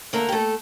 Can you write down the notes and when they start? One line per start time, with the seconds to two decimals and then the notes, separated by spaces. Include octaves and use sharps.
0.13 D3 A3 A#3 A#4
0.29 G4
0.32 A3 A4